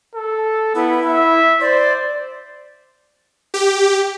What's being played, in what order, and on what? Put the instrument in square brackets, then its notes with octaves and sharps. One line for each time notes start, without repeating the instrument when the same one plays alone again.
[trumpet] A4
[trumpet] B3 [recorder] E4
[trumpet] E5
[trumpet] C5 [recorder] D5
[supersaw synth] G4